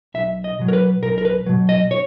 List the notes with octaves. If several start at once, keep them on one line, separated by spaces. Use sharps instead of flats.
B1 E5
D#5
B2 F#3
A#4
B4
B1 A#4
A#4
B4
B2 F#3
D#5
C#5